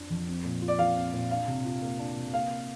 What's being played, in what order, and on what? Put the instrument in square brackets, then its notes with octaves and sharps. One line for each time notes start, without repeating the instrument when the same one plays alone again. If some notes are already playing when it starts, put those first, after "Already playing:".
Already playing: [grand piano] F2 F3 D4 F4
F2
C4
A#2
F4
[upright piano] D5
[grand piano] F3 [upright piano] F5
[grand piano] C4
A#2
[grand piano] D4 [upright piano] F5
[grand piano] C3
F4
A#3
D4
C3
[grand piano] A#3 [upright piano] F5